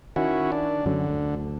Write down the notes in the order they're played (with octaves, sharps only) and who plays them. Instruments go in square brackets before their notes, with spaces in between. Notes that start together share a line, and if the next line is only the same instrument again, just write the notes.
[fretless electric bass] D#3 [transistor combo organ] C#4 E4 F#4
[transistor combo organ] D4
[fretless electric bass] F#2 F#3 C#4 [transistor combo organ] D3
[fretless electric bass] D2